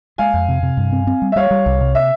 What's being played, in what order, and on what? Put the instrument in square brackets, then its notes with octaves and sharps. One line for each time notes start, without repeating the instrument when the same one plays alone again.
[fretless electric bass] G#3 [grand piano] F5 G#5
[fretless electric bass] F2
C3
C3
G2
C4
C4
G3
[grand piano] E5
[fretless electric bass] G3 [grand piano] C#5 F5
[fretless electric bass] G3
C2
C3
[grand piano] E5